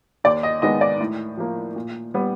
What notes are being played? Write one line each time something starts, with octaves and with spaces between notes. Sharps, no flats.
D#2 D5
D#5
D#3 G#3 B3 D#5
D5
A2
F3 A#3
A#2
G3 B3